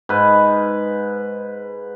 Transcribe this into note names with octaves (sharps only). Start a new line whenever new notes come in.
G#2 B4